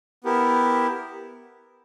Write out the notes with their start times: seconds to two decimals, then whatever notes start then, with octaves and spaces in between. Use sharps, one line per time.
0.24 B3 E4 G4 A#4